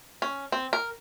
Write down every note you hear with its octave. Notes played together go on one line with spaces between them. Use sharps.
C#4
C4
A#4